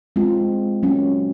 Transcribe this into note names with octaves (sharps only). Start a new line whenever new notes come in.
G#3 C4 F4
F#3 A#3 C#4